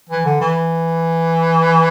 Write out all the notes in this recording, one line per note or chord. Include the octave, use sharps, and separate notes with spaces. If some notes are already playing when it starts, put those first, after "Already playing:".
E3
D3
E3